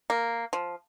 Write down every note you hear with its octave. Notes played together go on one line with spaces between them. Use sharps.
A#3
F3